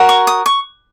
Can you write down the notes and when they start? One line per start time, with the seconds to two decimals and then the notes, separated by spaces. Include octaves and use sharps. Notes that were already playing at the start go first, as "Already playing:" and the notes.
Already playing: F#4 A#4 C#5
0.09 C#6
0.27 D#6
0.46 C#6